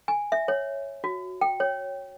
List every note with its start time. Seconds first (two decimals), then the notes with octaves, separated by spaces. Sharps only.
0.08 G#5
0.32 E5
0.48 C#5
1.04 F#4
1.41 G5
1.60 C#5